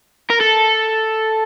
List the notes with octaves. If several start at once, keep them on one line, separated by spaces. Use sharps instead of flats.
A#4
A4